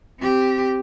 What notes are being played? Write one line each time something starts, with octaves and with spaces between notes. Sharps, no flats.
C4 G4